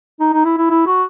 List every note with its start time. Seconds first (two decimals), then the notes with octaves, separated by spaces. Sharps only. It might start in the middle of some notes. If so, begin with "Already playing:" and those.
0.20 D#4
0.33 D#4
0.45 E4
0.57 E4
0.70 E4
0.86 F#4